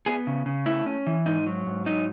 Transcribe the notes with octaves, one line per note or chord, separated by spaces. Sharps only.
B3 G#4
C#3
C#3
A3 E4
C#4
E3
G#2 D#4
F#3
G#2
F#3 D#4